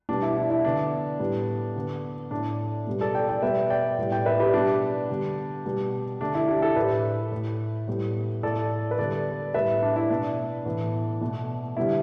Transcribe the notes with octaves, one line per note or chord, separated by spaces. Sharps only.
B2 G3 B3 D4
E4
E4
E4
D3 B3 D4
A2 G3 B3
D3 B3
A2 A3 D4
B2 G3 B3
A4 D5
D5 G5
D5 G5
B2 G3 B3 B4 E5
D5 G5
A2 G3 B3
D5 G5
B4 E5
G4 B4
B2 G3 B3 D4 G4
D3 G3 B3
B2 G3 B3
D3 A3 D4
E4
D4 G4
E4 A4
A2 A3 G4 B4
A2 A3
A2 G3 B3
A2 A3 A4 D5
B4
D3 G3 B3 A4 D5
A2 G3 B3 B4 E5
D4
E4
B2 B3 D4
A2 E3 B3
B2 A3
D3 G3 B3 E4